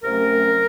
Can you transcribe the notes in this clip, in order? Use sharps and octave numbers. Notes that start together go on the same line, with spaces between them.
C2 C3 F#3 A3 C#4 A#4